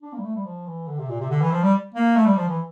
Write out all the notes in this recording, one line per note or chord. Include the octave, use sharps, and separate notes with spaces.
D4
A#3
G3
A3
G3
F3
E3
D3
C3
A#2
C3
D3
E3
F3
G3
A#3
A3
G3
F3
E3